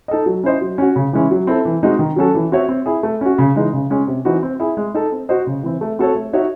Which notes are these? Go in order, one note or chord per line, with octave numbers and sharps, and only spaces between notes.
D#4 A4 D#5
F#3
C#4 E4 C5 D#5
F#3
C#4 F#4
C#3
E3 G#3 C#4 E4
F#3
C4 E4 A4
E3
G#3 C4 D#4 F#4
D#3
F#3 C#4 F#4 A4
E3
C4 F#4 C#5 E5
C4
E4 G#4
A3
C#4 F#4
C#3
E3 G#3 D#4
C#3
G#3 C#4
C3
E3 C4 D#4 F#4
C4
E4 G#4
G#3
D#4 A4
C4
F#4 C5 D#5
C#3
E3 C4
A3
C4 F#4 A4 C#5
A3
D#4 F#4 C#5 E5